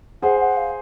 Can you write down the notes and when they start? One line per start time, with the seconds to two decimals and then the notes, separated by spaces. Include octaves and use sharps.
0.22 G#4 C5 F#5
0.40 F#5
0.57 F5